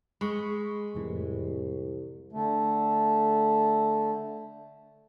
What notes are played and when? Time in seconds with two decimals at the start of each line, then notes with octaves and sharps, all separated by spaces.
0.21 G#3 B5 C#6
0.94 C2 F2 A2 E3
2.32 D3 A3